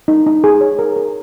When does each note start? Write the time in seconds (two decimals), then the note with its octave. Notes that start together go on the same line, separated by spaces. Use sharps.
0.08 D#4
0.27 D#4
0.44 G#4
0.61 C#5
0.79 A#4
0.96 A#4